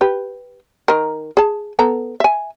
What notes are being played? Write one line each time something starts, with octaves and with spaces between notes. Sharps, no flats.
G4 B4
D#3 A#4
G#4 A5
B3 A4 A#5
E5 G#5